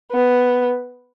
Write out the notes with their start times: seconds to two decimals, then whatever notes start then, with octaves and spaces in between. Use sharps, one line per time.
0.12 B3